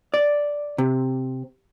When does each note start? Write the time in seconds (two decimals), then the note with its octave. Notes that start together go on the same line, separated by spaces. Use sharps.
0.14 D5
0.78 C3